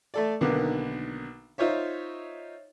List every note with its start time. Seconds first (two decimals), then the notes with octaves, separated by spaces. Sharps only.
0.14 A3 A4 D5
0.41 B1 D3 D#3 A#3 B3
1.58 D#4 F4 C5 C#5 E5